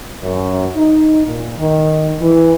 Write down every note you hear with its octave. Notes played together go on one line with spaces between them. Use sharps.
F#2
D#4
A#2
D#3
E3